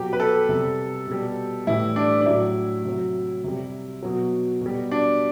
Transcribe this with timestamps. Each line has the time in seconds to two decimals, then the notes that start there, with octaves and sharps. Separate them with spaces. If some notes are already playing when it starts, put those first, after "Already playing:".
Already playing: B2 F#3 G4
0.13 B4
0.20 A4
0.49 C3 G3
1.07 B2 G3
1.67 A2 E3 G3 E4
1.96 D4
2.21 D4
2.26 A2 F#3 E4
2.85 C3 F#3
3.44 C3 G3
4.03 B2 F#3
4.61 B2 G3
4.91 D4